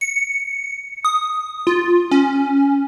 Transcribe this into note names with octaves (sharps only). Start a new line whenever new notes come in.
C#7
D#6
F4
C#4